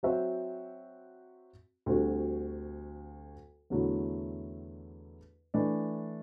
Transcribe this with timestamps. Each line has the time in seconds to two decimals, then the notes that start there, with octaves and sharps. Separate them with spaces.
0.03 F#3 C4 F#4 C5 E5
1.86 D2 D3 G3 C4 F#4
3.70 E2 D3 F#3 A3 E4
5.54 E3 A3 D4